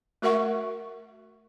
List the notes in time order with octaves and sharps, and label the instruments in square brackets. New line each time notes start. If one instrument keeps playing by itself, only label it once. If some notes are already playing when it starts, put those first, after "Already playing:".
[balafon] A3 F#4 A#4 E5 F#5 C#6